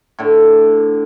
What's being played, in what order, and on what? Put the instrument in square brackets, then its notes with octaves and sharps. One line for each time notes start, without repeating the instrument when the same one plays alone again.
[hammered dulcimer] A2 D3